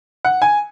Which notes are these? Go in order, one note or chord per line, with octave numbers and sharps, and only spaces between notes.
F#5
G#5